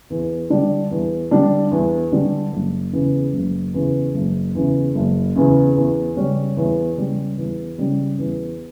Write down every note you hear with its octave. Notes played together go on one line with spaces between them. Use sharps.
E2
D3 G3 D4
E2
D3 G3 D4
E2
D3 G3 D4
F#1
E2 C#3
F#1
E2 C#3
F#1
E2 C#3
F#1
E2 C#3
E2
C#3 G3 C#4
E2
C#3 G3 C#4
E2
C#3 G3 C#4
E2